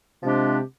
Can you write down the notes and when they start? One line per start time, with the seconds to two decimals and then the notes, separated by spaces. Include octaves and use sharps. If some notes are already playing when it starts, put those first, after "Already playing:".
0.23 C3 F3 G#3 D4 G4